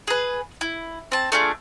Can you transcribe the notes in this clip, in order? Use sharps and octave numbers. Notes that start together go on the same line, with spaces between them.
G#4 B4
E4
C4 A5
A3 D4 F4 G#4